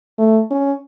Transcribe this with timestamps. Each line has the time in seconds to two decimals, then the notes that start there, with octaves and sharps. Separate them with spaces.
0.18 A3
0.51 C#4